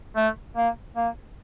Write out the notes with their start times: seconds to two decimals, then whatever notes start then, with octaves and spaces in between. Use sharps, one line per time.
0.16 A3
0.57 A#3
0.96 A#3